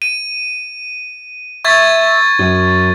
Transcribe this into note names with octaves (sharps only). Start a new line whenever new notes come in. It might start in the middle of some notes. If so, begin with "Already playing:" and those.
D#7
E5 C#6 G#6 A6
F#2